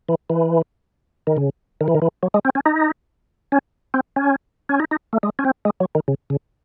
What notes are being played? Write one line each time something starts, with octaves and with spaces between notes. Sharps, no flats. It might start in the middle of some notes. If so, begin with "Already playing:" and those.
E3
E3
D#3
C#3
D#3
E3
D#3
E3
F#3
G#3
C4
C#4
D#4
C#4
C4
C#4
C#4
D#4
D#4
A3
G#3
C#4
C4
G#3
F#3
D#3
C#3
C#3